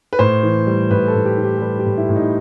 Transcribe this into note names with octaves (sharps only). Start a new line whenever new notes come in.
B4
A2 C5
E3
G3
A2 B4
A4
A2
G4
E3
G4
A4
G3 B4
G4
A2
E4
A2
D#4